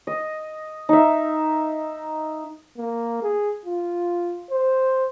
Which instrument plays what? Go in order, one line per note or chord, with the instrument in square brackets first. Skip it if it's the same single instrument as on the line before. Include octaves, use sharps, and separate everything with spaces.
[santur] D#5
D#4 E5
[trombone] A#3
G#4
F4
C5